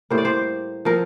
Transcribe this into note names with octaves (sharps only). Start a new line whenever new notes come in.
A2 G3 A#3 C5
D5
C5
F3 C4 A#4